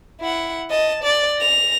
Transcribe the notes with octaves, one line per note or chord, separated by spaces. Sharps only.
E4 F#5
D#5 A5
D5
A#6 F7